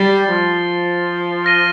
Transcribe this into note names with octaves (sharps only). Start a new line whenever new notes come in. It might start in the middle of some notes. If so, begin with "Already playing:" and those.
Already playing: G3 A6 C7 G7
F3
F6 A#6 D#7 G7